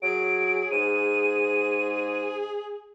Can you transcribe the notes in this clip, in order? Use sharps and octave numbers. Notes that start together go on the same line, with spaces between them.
F#3 G#4 D7
G#2 D#7